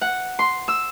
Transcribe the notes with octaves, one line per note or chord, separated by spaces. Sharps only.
F#5
C6
E6